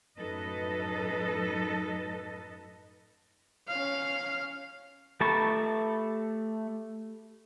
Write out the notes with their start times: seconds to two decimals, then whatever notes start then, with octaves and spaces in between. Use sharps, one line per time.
0.19 F#2 A2 D#4 A4 B4 D#5
3.68 C#4 F5
5.21 A3 G4 A4 A5 B5 C#6